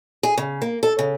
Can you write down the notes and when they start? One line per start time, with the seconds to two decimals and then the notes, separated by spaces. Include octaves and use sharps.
0.23 G#4
0.38 C#3
0.62 A#3
0.83 A4
0.99 C#3